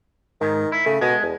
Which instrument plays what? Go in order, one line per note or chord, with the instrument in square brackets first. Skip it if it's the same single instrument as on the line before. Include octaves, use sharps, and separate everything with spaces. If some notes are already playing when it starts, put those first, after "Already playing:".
[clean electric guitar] G#2 [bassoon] D#3
[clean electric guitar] E4
[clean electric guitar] C#3 [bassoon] A3
[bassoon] B2 [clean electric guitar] G#3
[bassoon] E2